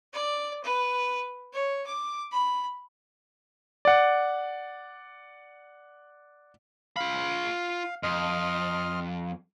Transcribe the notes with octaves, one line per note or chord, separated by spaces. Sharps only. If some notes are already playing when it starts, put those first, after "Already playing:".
D5
B4
C#5
D6
B5
D5 F#5
F4 F5 B5
F2 D#5 C6 F6